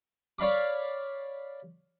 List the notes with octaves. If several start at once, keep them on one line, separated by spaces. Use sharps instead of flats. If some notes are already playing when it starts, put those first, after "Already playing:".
C#5 D5 F5 B5 D6